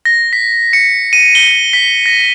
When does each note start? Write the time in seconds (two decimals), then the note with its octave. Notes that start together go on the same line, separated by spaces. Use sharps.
0.05 A#6
0.33 B6
0.73 C#7
1.13 D#7
1.35 G7
1.73 B6
2.06 A#6